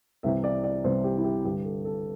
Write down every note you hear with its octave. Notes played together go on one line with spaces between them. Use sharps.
C2 C3 E3 E5
D5
D5
C2 C3 E3 C5
G4
E4
G4
G2 D3 G4
A4
A4